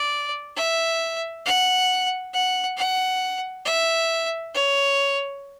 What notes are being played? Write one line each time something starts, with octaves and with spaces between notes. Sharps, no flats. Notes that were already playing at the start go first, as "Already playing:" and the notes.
Already playing: D5
E5
F#5
F#5
F#5
E5
C#5